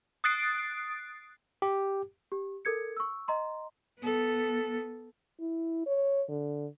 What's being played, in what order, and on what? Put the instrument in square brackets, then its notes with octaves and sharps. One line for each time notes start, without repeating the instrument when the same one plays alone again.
[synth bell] D#6 F#6 A6 C7 D7
[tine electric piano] G4
[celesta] G4
A4 A#4 G#6 C#7
C#6 E6
D#5 A#5 C6
[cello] B3 A4
[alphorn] E4
C#5
D3